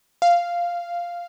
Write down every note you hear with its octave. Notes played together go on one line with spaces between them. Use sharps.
F5